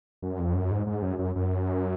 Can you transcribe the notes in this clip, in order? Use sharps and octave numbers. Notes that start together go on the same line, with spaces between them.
F#2
F2
F#2
G#2
G#2
F#2
F#2
F#2